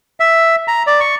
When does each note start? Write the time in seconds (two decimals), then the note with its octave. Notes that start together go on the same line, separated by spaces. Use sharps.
0.20 E5
0.68 A#5
0.87 D5
1.00 C#6